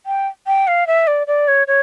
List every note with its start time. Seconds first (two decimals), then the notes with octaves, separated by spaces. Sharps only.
0.06 G5
0.47 G5
0.68 F5
0.87 E5
1.07 D5
1.27 D5
1.48 C#5
1.68 C#5